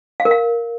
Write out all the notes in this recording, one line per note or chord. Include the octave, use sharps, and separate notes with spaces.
F5
A#4
F5